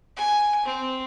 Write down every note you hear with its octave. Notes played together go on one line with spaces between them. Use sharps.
G#5
C4